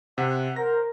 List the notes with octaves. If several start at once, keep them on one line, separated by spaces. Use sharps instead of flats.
C3 F#5
A#4 C5 A#6